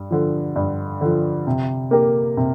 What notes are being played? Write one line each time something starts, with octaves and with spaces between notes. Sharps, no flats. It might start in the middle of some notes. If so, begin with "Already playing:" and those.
Already playing: G2
D3 F3
G2
D3 F3
C3
A#3 G4 A#4
C3